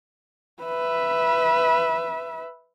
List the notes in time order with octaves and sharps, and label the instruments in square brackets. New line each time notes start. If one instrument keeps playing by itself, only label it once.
[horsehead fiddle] B4 E5